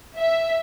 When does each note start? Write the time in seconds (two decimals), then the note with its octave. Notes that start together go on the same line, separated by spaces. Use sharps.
0.17 E5